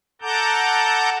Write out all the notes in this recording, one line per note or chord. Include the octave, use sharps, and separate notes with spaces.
A4 F#5 A5 A#5 D6 G6